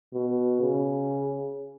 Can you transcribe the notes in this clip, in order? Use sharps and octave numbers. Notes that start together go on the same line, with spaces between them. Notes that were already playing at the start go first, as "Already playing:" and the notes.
B2
C#3